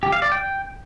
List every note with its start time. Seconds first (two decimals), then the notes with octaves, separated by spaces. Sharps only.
0.03 G4
0.12 F5
0.22 D5
0.32 G5